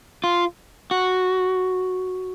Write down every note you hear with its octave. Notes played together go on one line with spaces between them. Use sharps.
F4
F#4